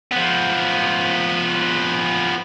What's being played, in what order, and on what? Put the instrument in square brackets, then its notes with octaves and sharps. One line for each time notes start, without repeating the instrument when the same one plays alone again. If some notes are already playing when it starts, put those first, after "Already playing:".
[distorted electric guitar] F3 B3